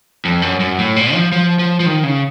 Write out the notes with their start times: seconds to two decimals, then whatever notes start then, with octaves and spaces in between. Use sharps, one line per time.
0.25 F2
0.42 F#2
0.60 F#2
0.78 A2
0.96 A#2
1.14 F3
1.32 F3
1.59 F3
1.80 F3
1.86 D#3
2.04 C#3